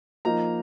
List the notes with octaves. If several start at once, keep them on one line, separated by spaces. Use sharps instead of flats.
F3 A#3 D#4 A#5